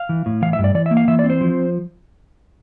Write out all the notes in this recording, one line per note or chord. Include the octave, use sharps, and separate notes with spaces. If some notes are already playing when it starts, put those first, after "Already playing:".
Already playing: F5
E3
A2
E3 F5
E5
G2
D5
E3 D5
E5
A#3
F5
E3 E5
D5
C4
C5
F3